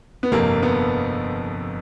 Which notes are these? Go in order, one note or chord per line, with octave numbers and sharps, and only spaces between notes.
B3
G1 F2 C3 A#3
B3